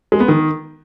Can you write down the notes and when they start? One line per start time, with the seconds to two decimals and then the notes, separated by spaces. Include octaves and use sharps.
0.12 G#3
0.20 B3
0.28 D#3